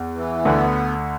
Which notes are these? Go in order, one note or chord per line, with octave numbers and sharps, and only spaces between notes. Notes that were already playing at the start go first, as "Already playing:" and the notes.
Already playing: E2
E3
D2 D3 B3